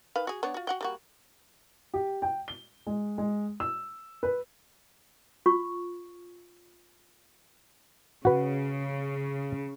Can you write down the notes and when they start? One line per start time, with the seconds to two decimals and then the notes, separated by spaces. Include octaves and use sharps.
0.16 D#3 B4 F5
0.27 F#4 G#4
0.43 B3 D4 C#5
0.54 F4 F#4
0.67 F#4 F#5 G5
0.81 G3 A#3 F#4
1.94 G4
2.22 G5
2.48 G7
2.87 G#3
3.18 G#3
3.60 E6
4.23 B4
5.46 F4 C#6
8.25 C#3 F#4 B4